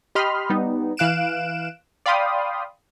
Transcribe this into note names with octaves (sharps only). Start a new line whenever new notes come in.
G4 D#5 B5 C6 F6
G3 B3 D#4
E3 F5 F#6 D7 E7
D5 F5 G5 B5 C6 D#6